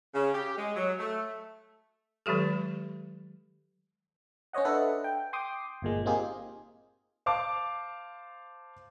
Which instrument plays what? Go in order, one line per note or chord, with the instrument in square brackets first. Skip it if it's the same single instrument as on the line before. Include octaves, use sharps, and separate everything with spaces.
[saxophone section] C#3
G4
G#3
F#3
A3
[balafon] D#3 F#3 G#3 G4 A4
[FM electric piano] C#4 C5 C#5 D#5 F#5
D4 A4 B4 D#5 E5 F#5
G5
G5 C6 D6 D#6
G1 A#2 G#3
A#3 C4 D#4 F4 G4 G#4
[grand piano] C5 F5 A5 D6